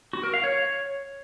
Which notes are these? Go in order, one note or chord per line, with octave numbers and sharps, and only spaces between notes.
F#4
A#4
F5
C#5